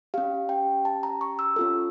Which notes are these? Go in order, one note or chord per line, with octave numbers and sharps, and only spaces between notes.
C#4 G4 F5
G5
A5
A#5
C#6
E6
C#4 F4 A4